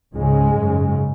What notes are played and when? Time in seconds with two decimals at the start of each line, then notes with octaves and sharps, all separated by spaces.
0.14 C#2 G#2 C#3 G#3
0.55 F#2 C#3